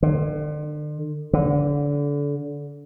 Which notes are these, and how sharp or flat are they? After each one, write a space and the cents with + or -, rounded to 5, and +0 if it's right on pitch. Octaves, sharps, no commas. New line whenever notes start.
D3 +40
D3 -25